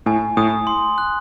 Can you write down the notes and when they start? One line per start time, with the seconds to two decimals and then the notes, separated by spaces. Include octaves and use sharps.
0.06 A2 G#5
0.37 A2 D#6
0.67 C6
0.98 F#6